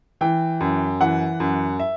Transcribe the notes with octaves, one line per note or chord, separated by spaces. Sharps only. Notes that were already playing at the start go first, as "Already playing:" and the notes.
E3 G5
F#2
E3 F#5
F#2
E5